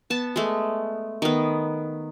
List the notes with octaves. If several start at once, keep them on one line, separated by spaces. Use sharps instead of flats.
B3 A5
G#3 A3
D#3 B3